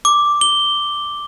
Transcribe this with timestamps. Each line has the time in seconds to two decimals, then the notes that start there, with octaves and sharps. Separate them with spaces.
0.05 D6
0.41 G7